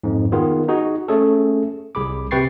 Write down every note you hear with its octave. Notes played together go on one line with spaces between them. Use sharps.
F2 G#2
D#3 B3 F4 G#4
D#4 F#4 G#4
A3 C#4 G#4 A4
C2 G#4 B5 D6
C3 B4 G5 C#6 A6 C7